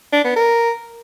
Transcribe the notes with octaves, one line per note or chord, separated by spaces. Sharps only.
D4
B3
A#4